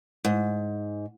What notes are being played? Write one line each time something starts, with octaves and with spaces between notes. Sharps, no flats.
G#2